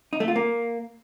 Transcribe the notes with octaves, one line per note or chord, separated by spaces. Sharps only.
D#4
A3
F4
A#3